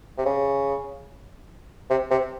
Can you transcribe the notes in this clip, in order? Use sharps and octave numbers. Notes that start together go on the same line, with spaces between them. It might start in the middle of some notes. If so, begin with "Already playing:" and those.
C3
C#3
C3
C3